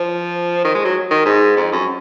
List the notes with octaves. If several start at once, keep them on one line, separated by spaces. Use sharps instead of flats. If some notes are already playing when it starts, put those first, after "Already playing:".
Already playing: F3
D#3
G#3
F#3
D#3
G#2
F2
F#2